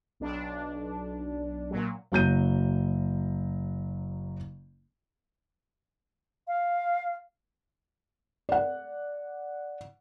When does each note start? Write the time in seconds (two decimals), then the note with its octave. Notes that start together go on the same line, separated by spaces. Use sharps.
0.20 B1 D4
1.71 A#2 F#3
2.12 F#1 F#3 G6 D#7
6.48 F5
8.49 D5 F#5